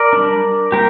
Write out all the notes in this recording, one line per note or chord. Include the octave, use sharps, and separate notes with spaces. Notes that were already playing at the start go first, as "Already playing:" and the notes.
Already playing: A#4 D5
G3 D4
G3 A#3 G4 A#4